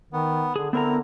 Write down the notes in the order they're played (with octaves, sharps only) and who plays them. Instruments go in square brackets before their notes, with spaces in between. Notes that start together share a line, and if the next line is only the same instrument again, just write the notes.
[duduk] D#3 [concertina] B3
[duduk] D3 [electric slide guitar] G#4
[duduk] D3 [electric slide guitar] B3 A#4 A#5 [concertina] C4 E4